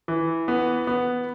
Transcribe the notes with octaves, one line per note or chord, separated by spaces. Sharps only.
E3
B3
B3